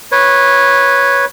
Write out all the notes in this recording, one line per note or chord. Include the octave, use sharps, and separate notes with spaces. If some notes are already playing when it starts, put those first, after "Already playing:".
B4 C#5